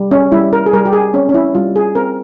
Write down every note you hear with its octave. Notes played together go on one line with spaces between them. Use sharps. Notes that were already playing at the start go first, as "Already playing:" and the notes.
Already playing: G3
C#4
G3 E4
A#4
G#4
G3 A#4
G4
G#4
C4 C#4
C#4
E4
G3 F4
G#4
C4 A#4